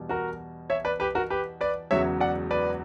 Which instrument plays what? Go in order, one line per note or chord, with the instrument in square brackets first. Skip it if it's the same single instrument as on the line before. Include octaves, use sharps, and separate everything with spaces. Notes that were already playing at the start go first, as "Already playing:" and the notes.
Already playing: [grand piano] E2 B2 G3
F#4 A#4
C#5 E5
B4 D5
G4 B4
F#4 A#4
G4 B4
B4 D5
E1 E2 C#3 F#3 C#5 E5
D5 F#5
B4 D5